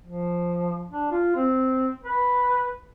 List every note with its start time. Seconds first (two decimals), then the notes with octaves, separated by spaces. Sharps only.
0.04 F3
0.91 D4
1.12 F4
1.36 C4
2.03 B4